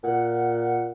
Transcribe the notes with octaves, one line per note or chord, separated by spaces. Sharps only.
A#2 F#5